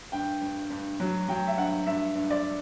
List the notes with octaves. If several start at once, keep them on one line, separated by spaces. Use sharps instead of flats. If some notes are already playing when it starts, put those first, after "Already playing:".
G2 G5
G2
G2
F#3
F#3 G5
E5
G2 F#5
G2 E5
G2
D5